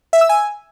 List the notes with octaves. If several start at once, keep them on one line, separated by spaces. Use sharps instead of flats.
E5
E6
G#5